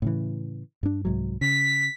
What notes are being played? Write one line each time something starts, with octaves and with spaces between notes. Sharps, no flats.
A2 C#3 E3
G2 D4
C2 G#2 F#3
C#3 B6